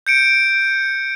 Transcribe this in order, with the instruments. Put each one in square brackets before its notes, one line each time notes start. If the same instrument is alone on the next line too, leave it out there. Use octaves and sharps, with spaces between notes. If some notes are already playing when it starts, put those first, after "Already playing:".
[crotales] G6 C#7 D7